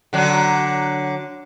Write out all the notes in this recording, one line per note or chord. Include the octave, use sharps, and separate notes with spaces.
D3 F#3 D4